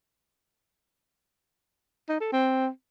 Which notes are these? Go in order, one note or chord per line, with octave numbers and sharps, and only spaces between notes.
D#4
A4
C4